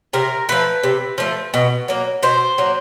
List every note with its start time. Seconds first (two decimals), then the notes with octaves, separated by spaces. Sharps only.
0.13 C3 A#4
0.49 F3 A3 B4
0.83 C3
1.18 F3 A3
1.54 B2
1.88 F#3 A#3
2.23 B2 C5
2.58 F#3 A#3